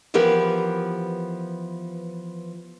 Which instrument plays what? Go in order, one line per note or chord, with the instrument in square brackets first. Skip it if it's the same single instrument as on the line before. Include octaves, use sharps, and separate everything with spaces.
[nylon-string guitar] E3 F3 B3 G4 A#4